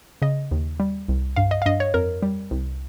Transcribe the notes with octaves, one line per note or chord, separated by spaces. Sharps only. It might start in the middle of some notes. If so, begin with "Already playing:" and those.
C#3 D#5
D#2
G3
C2
G2 F5
D#5
F5
G2 D#5
C#5
F2 A#4
G3
C2